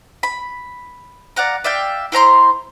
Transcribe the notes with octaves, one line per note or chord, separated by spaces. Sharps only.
B5
D5 F5 F#5 A#5
D5 E5 F5 G5
E4 C5 A#5 C6